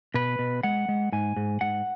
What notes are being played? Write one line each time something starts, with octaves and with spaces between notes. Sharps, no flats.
B2 B4
B2
G#3 F#5
G#3
G#2 G#5
G#2
G#2 F#5